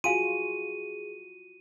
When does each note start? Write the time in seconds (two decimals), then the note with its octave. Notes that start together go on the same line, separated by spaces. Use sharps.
0.04 F4 F#4 G#4 F5 G#5 C6 D#7